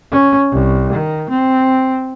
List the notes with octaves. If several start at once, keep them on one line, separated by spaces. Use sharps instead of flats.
C#4
C2
D#3
C4